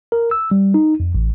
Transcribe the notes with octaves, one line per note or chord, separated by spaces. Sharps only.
A#4
E6
G3
D#4
F2
A1